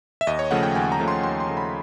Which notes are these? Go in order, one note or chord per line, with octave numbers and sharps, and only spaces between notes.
E5
D#2 D#5
C#5
C#3 F3 A3 F#5
G5
D#2 G#5
A#5
C#3 F3 A3
C6
D#2 C6
C6
C#3 F3 A3
B5